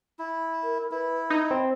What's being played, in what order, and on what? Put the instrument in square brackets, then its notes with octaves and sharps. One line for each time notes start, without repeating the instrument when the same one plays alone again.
[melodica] E4
[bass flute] A#4
[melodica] E4 [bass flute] B4
[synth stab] D#4 [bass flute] D#5
[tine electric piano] C4